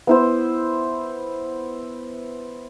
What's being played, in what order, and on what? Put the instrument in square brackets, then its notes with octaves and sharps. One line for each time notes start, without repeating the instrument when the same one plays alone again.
[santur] B3 E4 C5